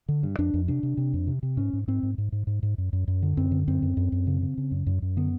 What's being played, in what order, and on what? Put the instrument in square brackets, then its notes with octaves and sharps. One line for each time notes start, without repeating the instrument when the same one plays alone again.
[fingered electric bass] D3
G2
F2 D4
F2
C3 D4
C3
C3
F2
C3
C3
G#2 C#4
G#2
G#2 C4
G#2
G#2
G#2
G#2
G#2
F#2
F#2
F#2
D3
F#2 C4
D3
F#2 C4
F#2
F#2
F#2
C#3
C#3
C#3
F#2
F#2
F#2
D3 B3